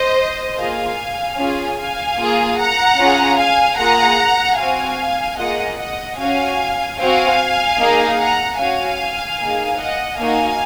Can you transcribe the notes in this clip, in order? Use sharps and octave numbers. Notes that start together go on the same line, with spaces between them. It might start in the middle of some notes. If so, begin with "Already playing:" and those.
Already playing: C5 D#5
A#3 F4 G#4 F5 G#5
C#4 F4 G#4
F5 G#5
A#3 F4 G#4
F#5 A#5
C#4 F4 G#4
F5 G#5
A#3 F4 G#4 F#5 A#5
C4 F#4 F5 G#5
A#3 F4 G#4 D#5 F#5
D#5 F#5
C#4 F#4 F5 G#5
C4 F#4 F5 G#5
A#3 D#4 G#4
F#5 A#5
C#4 F#4 F5 G#5
A#3 D#4 G#4
D#5 F#5
A#3 D#4 F#4 F5 G#5